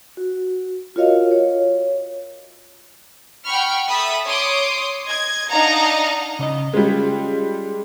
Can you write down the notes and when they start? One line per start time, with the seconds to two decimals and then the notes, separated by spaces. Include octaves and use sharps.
0.17 F#4
0.96 F4 F#4 A#4 C#5 D#5 F5
1.31 C#5
3.46 F#5 G5 B5 C#6 F6
3.87 A4 E5 B5 D#6
4.27 C#5 C6 D6 D#6
5.06 D#5 G#6
5.51 D4 D#4 D#5 F5 F#5 A#5
6.39 C#3 D5 D#5
6.74 G3 G#3 C#4 F4